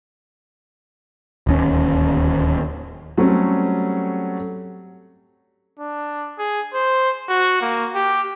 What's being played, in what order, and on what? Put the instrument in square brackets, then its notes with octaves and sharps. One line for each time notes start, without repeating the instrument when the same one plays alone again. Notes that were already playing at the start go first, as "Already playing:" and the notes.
[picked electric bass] D1 D#2 C#4
[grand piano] F#3 G3 A3 C4 C#4
[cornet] D4
G#4
C5
F#4
A#3
G4